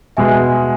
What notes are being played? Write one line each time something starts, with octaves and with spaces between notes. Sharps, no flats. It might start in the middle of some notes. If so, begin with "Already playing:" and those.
B2 G#3 E5 G#5